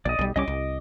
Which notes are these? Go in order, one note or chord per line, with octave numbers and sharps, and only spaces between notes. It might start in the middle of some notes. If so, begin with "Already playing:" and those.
A#1 D5 D#5
B1 G3
C2 G3 C#4 D#5 D6
C2